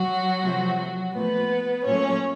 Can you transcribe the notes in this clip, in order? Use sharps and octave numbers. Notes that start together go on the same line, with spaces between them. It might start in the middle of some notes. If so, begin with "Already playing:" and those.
Already playing: F#3 F#4
C3 F3 A3
F#3 F#4
A#2 F3 A3 B3 B4
A#2 F#3 A3 C#4 C#5